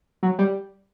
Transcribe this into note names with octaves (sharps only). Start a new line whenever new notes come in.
F#3
G3